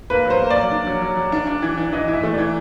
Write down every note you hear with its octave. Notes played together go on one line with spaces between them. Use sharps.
A#3 B4
F#3
C5
A#3
D5
F#3
D4
F#3
F#3
F#3
D4
D4
E3
D4
E3 D#5
E3
E5
A3
D5
E3